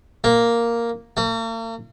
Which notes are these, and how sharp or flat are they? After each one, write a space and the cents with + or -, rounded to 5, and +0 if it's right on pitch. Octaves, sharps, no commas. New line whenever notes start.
A#3 +0
A#3 -45